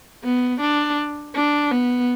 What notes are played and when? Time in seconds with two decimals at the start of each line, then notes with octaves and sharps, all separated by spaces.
0.24 B3
0.60 D4
1.35 D4
1.71 B3